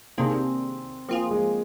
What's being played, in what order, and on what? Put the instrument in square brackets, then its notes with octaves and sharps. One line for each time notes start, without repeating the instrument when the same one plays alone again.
[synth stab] C3 D#3 A#3 D4 G#4 [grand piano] C4
[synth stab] F3 C4 F4 G#4 [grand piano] A#3
[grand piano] G#3